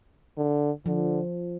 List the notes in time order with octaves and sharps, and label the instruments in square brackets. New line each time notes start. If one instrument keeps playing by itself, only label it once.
[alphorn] D3
[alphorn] D3 [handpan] F3